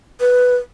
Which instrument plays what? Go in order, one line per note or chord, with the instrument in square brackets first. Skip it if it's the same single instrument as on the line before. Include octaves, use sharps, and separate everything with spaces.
[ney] B4